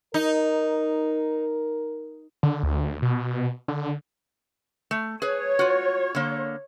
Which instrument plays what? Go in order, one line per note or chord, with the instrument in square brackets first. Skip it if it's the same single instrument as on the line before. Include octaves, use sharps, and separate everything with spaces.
[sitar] D#4 [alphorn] A#4
[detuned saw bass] D3
D2
B2
D3
[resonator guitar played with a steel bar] A3
[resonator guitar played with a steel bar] G#4 B4 [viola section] C#5
[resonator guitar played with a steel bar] F4 F#4
D3 A#3